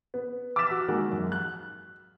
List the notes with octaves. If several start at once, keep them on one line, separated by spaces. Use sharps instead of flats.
B3
D6 E6 F6 A6 B6 E7
F#4
D#3 G#3 A#3 F#4 G#4 F#6
F#2
F#6